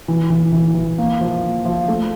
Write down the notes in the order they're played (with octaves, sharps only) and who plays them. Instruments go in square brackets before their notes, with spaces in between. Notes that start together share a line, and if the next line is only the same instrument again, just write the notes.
[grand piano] E3
E3
E3
E3
A#3
F3
A#3
F3
A3